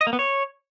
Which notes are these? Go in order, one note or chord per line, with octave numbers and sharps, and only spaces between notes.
D#5
A#3
B3
C#5